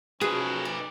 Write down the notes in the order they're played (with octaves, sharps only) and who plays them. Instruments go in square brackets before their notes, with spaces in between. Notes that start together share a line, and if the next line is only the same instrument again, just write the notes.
[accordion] F3 G#3 C#4 [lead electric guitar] D#4 B4 [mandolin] F#4 [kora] G#4
[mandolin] D5